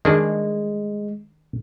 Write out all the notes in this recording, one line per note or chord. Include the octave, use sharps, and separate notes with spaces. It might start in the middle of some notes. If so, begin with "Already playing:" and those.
D#3 G#3 D4 G#4